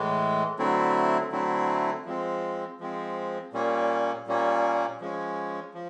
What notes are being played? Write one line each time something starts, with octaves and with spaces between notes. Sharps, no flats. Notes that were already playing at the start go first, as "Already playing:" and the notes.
Already playing: A2 E3 G#3
D3 F#3 A3 C4 E4
D3 F#3 A3 C4 E4
F3 G#3 C4
F3 G#3 C4
A#2 G3 A#3 C#4
A#2 G3 A#3 C#4
F3 G#3 C#4
F3